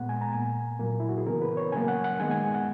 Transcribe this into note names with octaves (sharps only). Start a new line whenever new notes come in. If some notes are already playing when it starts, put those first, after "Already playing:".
Already playing: A#2 G#3 B3 F#5
G#5
A#5
A#2 A#3 G#5
A#2 F#3 A#3
E4
F#4
G#4
C#3 E3 B3 A#4
B4
C#5
C#3 F#3 A#3 G#5
F#5
F#5
D#3 G#3 B3 G#5
G#5
F#5